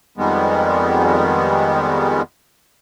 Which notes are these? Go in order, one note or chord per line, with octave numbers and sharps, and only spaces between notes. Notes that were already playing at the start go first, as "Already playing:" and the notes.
F2 D#3 G3 G#3 B3